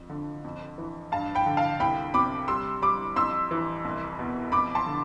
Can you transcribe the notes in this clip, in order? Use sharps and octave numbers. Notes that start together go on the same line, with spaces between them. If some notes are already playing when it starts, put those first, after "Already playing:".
Already playing: F2 F3
D3
F2
E3
G2 F5 A5
G5 B5
D3
F5 A5
C2 G5 B5
C3 B5 D6
G3 C6 E6
G3 B5 D6
F2 C6 E6
E3
C2
B2
F2 B5 D6
A5 C6
D3